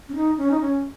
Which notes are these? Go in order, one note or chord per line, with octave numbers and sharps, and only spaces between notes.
C#4
D#4
C#4
D#4
C#4